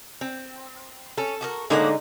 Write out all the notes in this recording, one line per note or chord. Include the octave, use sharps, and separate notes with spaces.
C4
C#4 A4
F#4 G4 A#4
A2 D3 G#3 A#3 D#4 F#5